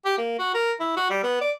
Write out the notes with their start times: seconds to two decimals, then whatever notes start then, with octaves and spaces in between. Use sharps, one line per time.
0.05 G4
0.18 A#3
0.39 F#4
0.54 A#4
0.80 E4
0.96 F#4
1.10 G3
1.23 B3
1.41 D5